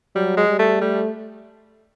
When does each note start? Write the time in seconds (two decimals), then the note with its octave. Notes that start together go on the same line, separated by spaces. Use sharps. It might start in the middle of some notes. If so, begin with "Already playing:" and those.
0.15 F#3 G3
0.37 G#3
0.49 G3
0.59 A3
0.81 G3 A3